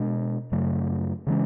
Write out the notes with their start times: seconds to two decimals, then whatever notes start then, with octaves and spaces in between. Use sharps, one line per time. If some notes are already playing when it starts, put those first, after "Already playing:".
Already playing: B2 G#3 D4
0.52 F#2 C#3 F#3 A3
1.27 C#3 E3 G#3 C#4